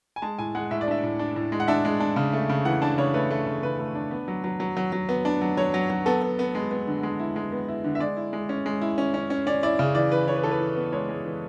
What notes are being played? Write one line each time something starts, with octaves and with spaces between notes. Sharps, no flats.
G#5
G#3 A5
A2 G#5
G#3 F#5
A2 E5
D5
D4 E5
A2
D4
A2
G#3
F#5
D4 E5
G#3
D4
C#3
A3
C#3
E3 F#5
D4 A5
C#3 C#5
A3 B4
A3
C#3
C#3 B4
A3
D4
B3
F#3
F#3
F#3
F#3
F#3
B3
D4
F#3
F#3 C#5
F#3
F#3
B3 A4
B3
B3
G#3
B3
D3
G#3
E4
G#3
B3
E4
D3
E5
G#3 D5
E4
G#3
C#4
G#3
E4
C#4
C#4
C#4
C#4 D5
E4 D5
C#3
E3 D5
E3 B4
E3 C#5
B4
E3 A4
B4
E3
B3
G#3 C#5
G#3
E3